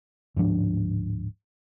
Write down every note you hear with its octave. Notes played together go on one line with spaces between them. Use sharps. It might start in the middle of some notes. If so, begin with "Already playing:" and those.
D1 G#2 F3 D4